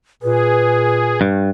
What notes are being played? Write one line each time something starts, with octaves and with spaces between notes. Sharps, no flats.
A#2 G#4 B4
G2